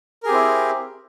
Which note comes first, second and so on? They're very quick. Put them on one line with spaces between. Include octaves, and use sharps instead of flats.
A#4 G#4 G4 C4 E4